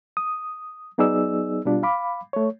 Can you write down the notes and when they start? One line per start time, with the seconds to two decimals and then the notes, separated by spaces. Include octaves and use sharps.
0.17 D#6
0.98 F#3 B3 D#4 G#4 D5 E6
1.65 B2 G3 D4 F4
1.83 F5 B5 D6
2.33 A3 C#5